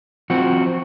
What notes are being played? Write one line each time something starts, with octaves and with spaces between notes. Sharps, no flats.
F3 C4 F#4